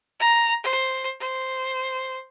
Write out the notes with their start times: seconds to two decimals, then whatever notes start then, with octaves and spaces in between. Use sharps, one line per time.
0.20 A#5
0.64 C5
1.21 C5